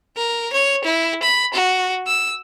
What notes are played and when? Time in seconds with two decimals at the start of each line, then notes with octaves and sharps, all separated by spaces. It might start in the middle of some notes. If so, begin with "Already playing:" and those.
0.16 A#4
0.52 C#5
0.84 E4
1.23 B5
1.54 F#4
2.07 E6